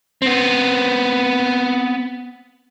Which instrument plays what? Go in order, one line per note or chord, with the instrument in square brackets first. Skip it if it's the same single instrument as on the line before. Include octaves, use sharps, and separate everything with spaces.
[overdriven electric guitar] B3 C4